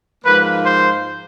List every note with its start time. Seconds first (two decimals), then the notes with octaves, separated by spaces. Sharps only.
0.24 G#2 F3 A#3 B4
0.66 C5